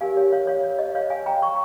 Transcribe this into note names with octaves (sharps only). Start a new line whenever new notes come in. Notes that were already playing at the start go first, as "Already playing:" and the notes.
C#4 G4 A#4 C#5 F5 G#5
C#5 F5
C#5 F5
C#5 F5
C#5
D#5
C#5 F5
F5 G#5
G5 A#5
A#5 C#6